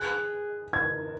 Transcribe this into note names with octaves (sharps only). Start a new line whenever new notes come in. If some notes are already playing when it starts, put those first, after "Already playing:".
Already playing: G#4 F#6
A#4 G#6